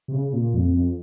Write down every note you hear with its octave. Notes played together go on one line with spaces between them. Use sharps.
C3
C#3
A#2
F2
F2